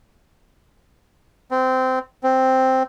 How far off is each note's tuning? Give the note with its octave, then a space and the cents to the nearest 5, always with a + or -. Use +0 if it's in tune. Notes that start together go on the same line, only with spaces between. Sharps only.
C4 -20
C4 +0